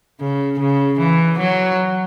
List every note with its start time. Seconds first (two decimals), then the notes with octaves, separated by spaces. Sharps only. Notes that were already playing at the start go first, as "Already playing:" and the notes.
0.21 C#3
0.59 C#3
1.00 E3
1.39 F#3